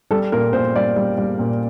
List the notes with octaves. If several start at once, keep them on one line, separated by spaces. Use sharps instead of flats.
G3 A4
A#2 A#4
A#2 C5
G3 D5
G3
G3
A#2